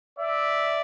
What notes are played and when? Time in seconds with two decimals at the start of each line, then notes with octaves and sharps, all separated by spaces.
0.19 D5 E5